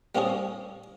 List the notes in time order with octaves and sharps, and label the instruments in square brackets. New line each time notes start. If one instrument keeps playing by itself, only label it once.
[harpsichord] G3 A#3 C4 C#4 G#4